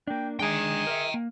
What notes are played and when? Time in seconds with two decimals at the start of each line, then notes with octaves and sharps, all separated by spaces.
0.07 A#3 D4 G5
0.39 D#3 G#3 D4 G#4 G5 A#5
0.87 A#4 D#5 E5
1.14 A#3